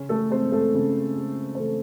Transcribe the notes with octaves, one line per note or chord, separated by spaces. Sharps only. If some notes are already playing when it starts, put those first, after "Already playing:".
Already playing: C#3 C#4
A3 A4
G#3 C4 C5
A3 A4
C#3
G#3
C5
C#3 A3 A4